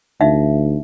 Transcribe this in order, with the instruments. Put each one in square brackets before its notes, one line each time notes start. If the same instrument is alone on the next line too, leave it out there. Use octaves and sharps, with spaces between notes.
[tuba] D2 [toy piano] D#4 E5 F5